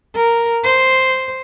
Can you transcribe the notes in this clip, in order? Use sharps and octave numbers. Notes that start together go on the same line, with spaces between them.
A#4
C5